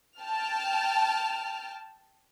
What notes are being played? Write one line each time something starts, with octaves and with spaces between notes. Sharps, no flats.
G5 A5 F6